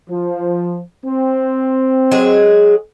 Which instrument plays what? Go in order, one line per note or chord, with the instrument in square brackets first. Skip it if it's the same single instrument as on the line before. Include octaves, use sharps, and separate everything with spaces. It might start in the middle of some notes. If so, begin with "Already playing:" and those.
[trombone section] F3
C4
[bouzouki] F#3 G#3 G#4